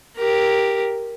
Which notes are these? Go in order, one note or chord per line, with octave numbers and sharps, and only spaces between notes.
G4 A#4